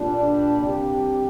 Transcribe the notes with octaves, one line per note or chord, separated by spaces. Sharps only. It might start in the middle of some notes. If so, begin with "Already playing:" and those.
Already playing: A#2 G3 D4
C3 G3 A#3 D4 G4